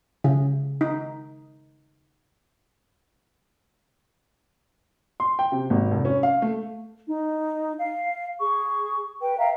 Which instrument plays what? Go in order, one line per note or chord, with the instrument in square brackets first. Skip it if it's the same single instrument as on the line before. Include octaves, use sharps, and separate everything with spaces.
[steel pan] C#3
D#4
[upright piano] C6
G5
C3
G#1
F1
C#4
F5
A3
[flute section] D#4
F5
G#4 C#6
B4 G5
E5 F5 G5 A#5